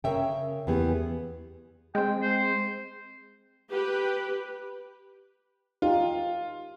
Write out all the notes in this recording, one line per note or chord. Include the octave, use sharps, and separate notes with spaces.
C#3 A#4 C#5 E5 G5
E2 E3 B3 G4 G#4
G#3 C4 G5
C5
G4 B4
D#4 F4 G4